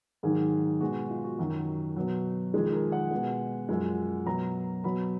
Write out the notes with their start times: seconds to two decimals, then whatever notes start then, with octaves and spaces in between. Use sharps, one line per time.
0.23 G#2 D#3 F#3 G#4
0.80 B2 G#3 F#4
1.10 F4
1.24 F#4
1.39 F#2 D#3 F#3
1.96 B2 F#3
2.54 F2 D#3 G#3 G#4
2.73 A#4
2.92 F#5
3.11 B2 G#3
3.69 F#2 F3 G#3
4.26 B2 F#3 A#5
4.84 B2 F#3 B5